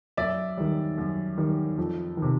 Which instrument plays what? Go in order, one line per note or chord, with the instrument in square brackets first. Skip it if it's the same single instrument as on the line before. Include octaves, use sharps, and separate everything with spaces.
[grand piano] F#2 D5 E5
D#3 G3
F#2
D#3 G3
F2
C3 D#3